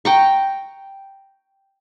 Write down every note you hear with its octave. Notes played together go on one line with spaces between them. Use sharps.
G5 A#5 C#6